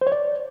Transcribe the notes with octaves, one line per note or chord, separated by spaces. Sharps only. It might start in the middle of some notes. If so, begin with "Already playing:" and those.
C5
C#5
D5